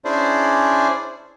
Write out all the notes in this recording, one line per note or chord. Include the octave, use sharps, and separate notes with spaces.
C#4 D4 E4 G#4 C5 D5